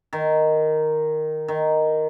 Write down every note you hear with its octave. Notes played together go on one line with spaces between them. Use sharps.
D#3
D#3